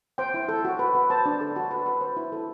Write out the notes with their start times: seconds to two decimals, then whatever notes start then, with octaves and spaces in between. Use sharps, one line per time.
0.18 C5 G5
0.34 E4
0.49 A4
0.65 F#4
0.79 B4
0.95 B4
1.10 C5 A5
1.26 D4
1.41 A4
1.56 F#4 A5
1.71 B4
1.86 B4
2.01 C5
2.17 E4
2.32 A4